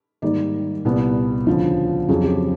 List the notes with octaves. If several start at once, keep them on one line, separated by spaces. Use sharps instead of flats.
G#2 D#3 G3 A#3 D5
C2 A#2 G3 B3
D2 C#3 F3
F2 C#3 F#3 G#4
G4